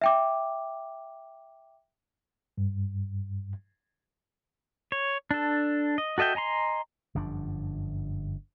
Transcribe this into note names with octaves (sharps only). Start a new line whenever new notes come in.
E5 G5 D6
G2
C#5
D4 A4
D#5
F#4 A4 D#5 E5 G5
D#5 G#5 A#5 C6
G1 F#2 F3 D4